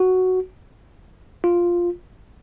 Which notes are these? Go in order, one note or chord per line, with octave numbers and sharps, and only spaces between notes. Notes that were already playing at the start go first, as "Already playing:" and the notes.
Already playing: F#4
F4